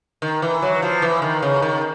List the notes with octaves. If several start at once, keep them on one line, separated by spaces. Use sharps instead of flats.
D#3
E3
F#3
F3
E3
D#3
C#3
D#3